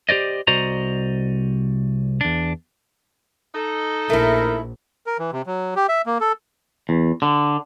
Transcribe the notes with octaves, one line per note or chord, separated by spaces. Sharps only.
G4 C5 D5 D#5
C2 F#4 C5 D5 D#5 A#5
E2 D4
D#4 A4
A#1 A3 E4 A#4
A#4
E3
C3
F#3
G4
E5
A#3
A4
E2
D3